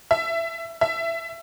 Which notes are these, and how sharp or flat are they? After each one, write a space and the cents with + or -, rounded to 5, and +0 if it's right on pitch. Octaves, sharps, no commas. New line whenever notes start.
E5 +15
E5 +15